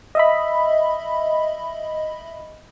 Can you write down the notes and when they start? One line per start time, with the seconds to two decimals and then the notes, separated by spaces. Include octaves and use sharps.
0.15 D#5 E5 B5